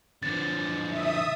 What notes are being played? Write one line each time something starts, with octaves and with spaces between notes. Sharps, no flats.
D3 F3 A6
E5 D#6